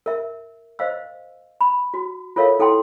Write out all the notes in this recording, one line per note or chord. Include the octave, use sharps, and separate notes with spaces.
A#4 E5
C5 D#5 F5 E6
B5
F#4
F4 A4 A#4 C#5 E5 F5
E4 A4 F#5 G5 C6